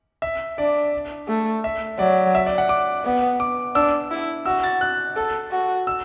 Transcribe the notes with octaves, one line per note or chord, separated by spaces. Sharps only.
E5
D4 D5
A3
E5
F#3 D5
E5
D5
F#5
D6
B3
D6
D4 E6
E4
F#4 E6
A6
F#6
A4
F#4
E6